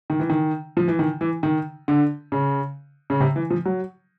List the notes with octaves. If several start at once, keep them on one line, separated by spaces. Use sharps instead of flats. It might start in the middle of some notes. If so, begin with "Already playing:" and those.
D#3
E3
D#3
F3
E3
D#3
E3
D#3
D3
C#3
C#3
C3
E3
F3
F#3